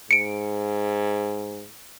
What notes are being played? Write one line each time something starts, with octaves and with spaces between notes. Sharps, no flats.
G#2 C#7 D7